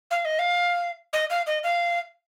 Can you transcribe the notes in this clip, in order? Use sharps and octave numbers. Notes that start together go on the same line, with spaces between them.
F5
D#5
F5
D#5
F5
D#5
F5